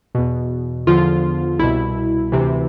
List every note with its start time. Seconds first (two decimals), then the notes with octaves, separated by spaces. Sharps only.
0.15 E2 B2
0.87 E2 D3 F3 F4
1.59 C2 B2 E4
2.32 D2 C3 E3